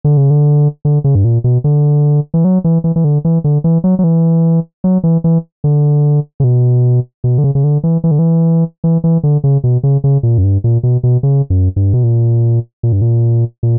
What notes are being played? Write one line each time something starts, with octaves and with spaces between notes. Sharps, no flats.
D3
C#3
D3
D3
C#3
G2
A#2
B2
D3
E3
F#3
E3
E3
E3
D3
E3
D3
E3
F#3
F#3
E3
F#3
E3
E3
D3
C#3
B2
B2
D3
C#3
C#3
D3
E3
E3
D3
E3
E3
E3
D3
C#3
B2
C#3
C#3
A#2
F#2
G2
A#2
B2
B2
C#3
F#2
G2
B2
A#2
A#2
G2
A#2
A#2